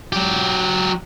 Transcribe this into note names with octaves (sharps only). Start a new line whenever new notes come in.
F#3 G4